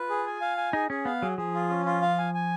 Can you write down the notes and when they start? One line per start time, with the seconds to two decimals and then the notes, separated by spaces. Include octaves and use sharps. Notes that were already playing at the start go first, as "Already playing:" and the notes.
Already playing: F4 B4
0.10 G#4
0.26 G#5
0.41 F5
0.57 G#5
0.73 D#4 G#4
0.90 C#4 G#4
1.05 B3 F5
1.22 F#3 G#4
1.38 F3 G#4
1.54 F4
1.70 C#4
1.86 F4
2.02 F5
2.18 G#5
2.34 G#5